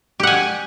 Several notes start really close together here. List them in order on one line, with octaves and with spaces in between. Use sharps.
G4 F#5 G#5